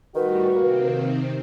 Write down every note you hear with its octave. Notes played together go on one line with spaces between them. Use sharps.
A2 D#3 G3 F#4 B4
C3 D#3 A#3 C4